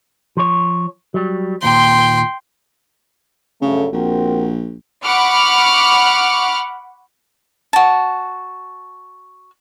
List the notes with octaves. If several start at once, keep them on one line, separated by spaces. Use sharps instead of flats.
F3 C#5
F#3 G3
D#2 A#2 G5 C6
G2 C#3 F#3 A3
A#1 C4 F#4 A#4
F#5 B5 C#6 D6 F6
F#4 A5